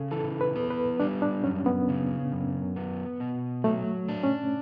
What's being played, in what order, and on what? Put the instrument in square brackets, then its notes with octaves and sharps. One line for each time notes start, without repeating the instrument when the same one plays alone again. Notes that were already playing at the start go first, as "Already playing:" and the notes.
Already playing: [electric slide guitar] C#3 [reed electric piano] A4
[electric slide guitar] E3 [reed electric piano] A4
[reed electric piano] B4
[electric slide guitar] B3
[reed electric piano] B4
[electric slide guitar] G3 [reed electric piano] D4
[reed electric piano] D4
[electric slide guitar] F#2 [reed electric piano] C#4
[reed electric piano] B3
[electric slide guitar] C#3
F#2
B3
B2
[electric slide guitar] F#3 [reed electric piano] A3
[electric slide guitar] D4
[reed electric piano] C#4